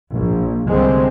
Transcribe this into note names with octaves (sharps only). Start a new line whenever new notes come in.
A#1
C2 D3 G#3 C4